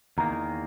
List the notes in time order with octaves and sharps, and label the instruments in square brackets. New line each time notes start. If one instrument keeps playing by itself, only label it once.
[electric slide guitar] E2 D#3 A#3 [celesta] A#5